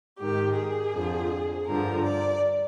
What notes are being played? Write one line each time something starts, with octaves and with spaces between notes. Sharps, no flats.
G#2 D#3 G4
G#4
F2 D3 F3
G2 D3 F3 A#4
D5